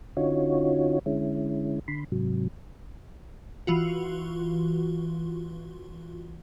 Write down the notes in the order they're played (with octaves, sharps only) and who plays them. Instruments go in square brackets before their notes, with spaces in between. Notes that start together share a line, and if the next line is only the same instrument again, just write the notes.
[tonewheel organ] D3 C#4 D#4 F4 F#4 C#5
D3 G#3 C#4 E4
D3 B5 C6
G#2 C3 F#3
[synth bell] E3 F4 F#4